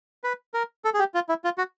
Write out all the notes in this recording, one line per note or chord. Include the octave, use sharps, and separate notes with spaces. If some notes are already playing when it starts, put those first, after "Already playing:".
B4
A#4
A4
G#4
G4
F4
E4
F4
F#4